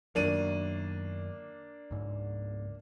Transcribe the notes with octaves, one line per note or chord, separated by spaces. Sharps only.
F#2 D#3 F#3 A#3 D4 D#7
C#2 G#2